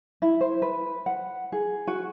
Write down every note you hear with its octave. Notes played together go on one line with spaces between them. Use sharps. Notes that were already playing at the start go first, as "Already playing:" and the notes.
E4
C5
B4
F#5
G#4
F#4